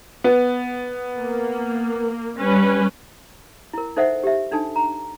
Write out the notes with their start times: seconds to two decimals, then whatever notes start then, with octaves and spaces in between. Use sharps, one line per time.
0.24 B3
1.17 A#3
2.38 G3 C#4 B4
3.73 E4 A#4
3.96 D#4 A4 C5 D#5 E5 F#5
4.24 G4 E5
4.51 D4 D#4 A4 G#5 A5
4.76 A#5